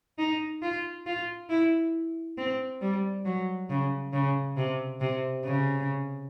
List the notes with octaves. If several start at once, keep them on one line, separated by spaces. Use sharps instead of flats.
D#4
F4
F4
E4
C4
G3
F#3
C#3
C#3
C3
C3
C#3